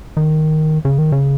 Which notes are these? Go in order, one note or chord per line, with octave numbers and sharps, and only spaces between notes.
D#3
C#3
D#3
C#3